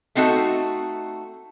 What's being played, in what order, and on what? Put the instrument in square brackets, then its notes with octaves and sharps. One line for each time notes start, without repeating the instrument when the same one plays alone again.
[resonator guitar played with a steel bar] A3 C4 D#4 F#4 A4